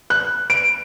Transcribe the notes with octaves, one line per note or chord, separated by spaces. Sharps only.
F#6
D7